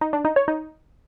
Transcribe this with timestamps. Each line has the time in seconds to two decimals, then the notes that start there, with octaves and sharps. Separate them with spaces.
0.01 D#4
0.13 D4
0.25 D#4
0.36 C#5
0.48 D#4